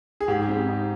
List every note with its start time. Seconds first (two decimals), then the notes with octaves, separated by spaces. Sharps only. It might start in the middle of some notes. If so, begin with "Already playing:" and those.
0.21 G#4
0.28 G#2 G4
0.48 C4
0.68 D#4